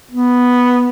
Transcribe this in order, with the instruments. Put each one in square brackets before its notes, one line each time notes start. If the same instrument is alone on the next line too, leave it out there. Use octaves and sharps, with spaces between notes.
[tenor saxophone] B3